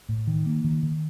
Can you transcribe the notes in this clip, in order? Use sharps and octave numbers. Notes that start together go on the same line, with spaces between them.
A2
D#3
A#3
D#3
D#3